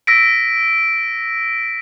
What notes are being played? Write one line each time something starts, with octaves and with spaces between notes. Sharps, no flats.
E6 A#6 B6 D7